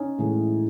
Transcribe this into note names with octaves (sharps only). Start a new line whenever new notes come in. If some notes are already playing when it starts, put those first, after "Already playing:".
Already playing: C#4 D#4
A2 E3 G#3